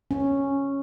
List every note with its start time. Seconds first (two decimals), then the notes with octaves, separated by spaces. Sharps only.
0.11 C#4